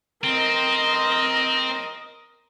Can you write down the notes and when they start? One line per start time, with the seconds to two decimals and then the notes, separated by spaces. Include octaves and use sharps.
0.24 C4 A#4 D#5